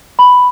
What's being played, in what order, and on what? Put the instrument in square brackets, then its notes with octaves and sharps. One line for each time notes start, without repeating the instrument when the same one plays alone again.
[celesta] B5